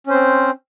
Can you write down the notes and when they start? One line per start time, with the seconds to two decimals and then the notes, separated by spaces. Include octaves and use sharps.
0.07 C#4
0.10 C5
0.13 C4